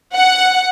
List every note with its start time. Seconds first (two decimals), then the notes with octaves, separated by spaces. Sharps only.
0.14 F#5